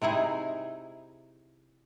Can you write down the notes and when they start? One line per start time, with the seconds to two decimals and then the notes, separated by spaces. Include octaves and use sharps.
0.02 C3 D#4 E4 G#4